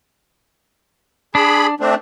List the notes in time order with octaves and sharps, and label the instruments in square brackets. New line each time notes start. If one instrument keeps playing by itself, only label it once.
[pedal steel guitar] D4 [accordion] G#4 B5
[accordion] A3 C4 D4